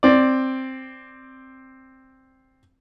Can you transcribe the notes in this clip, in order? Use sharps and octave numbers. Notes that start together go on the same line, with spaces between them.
C4 D5